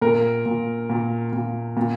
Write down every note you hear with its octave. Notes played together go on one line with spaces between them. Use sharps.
A#2 A#4
A#2
A#2
A#2
A#2